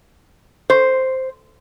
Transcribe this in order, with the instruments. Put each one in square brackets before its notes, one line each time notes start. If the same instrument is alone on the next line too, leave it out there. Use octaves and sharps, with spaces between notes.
[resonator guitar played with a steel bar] C5